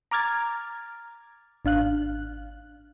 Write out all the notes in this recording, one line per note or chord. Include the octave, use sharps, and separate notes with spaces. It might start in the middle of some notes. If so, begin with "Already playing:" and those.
A#5 D6 F6 G#6 A6
G#1 D4 F5 F#6